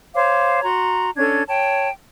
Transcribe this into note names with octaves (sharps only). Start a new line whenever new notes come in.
C5 C#5 F5 D6
F#4 A#5 C6
C#4 D4 A4 G#6
C#5 G5 A5